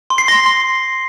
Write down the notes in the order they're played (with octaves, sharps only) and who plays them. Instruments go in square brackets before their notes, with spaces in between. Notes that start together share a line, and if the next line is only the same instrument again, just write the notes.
[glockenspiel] C6
C7
C6 A#6
C6